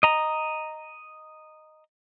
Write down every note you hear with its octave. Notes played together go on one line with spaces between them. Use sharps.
D#5 A#5